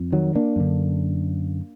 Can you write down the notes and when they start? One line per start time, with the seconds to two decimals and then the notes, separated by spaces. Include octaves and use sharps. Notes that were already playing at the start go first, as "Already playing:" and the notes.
Already playing: F2
0.12 D#3 F#3
0.35 A#3 D4
0.56 F#2 D3